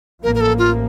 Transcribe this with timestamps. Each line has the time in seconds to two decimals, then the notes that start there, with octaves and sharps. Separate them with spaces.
0.23 A1 A2 F3 A#3 A#4
0.35 A#4
0.41 A4
0.58 F4